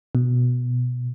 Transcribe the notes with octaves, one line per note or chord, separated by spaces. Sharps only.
B2